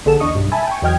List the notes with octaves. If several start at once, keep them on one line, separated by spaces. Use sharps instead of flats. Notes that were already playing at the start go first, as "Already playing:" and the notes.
A#1 D3 G#4 A4 E7
E2 D4 D#5 C#6 D#6
B1 G2
E5 G#5 A5 B5
G5 G#5 C#6
E2 F#3 D#5 G5 F6 G#6